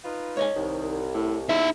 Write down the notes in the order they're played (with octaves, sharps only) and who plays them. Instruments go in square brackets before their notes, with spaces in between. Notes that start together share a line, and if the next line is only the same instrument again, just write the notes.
[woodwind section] D#4 F4 B4
[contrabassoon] G#2 [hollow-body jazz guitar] C#5 D#5 G#5
[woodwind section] C2 [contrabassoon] D#3
[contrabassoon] A2
[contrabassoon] E2 [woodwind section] G#3 C#4 E6 [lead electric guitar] D#4 E5